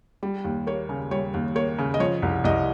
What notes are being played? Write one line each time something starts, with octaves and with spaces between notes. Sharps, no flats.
G3
D#2
A#3 C#5
C#3
G3 C#5
D#2
A#3 C#5
C#3
D#5
F3 C#5
C2
C2 D#5